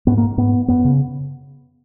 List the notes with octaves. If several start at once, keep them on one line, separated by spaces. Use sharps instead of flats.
G#2 B3
A#3
G#2 B3
F#2 B3
C#3